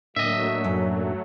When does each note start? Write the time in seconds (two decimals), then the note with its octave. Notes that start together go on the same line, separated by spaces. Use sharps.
0.16 A2 F#3 A3 A#3 D4 D#5 E5
0.64 F#2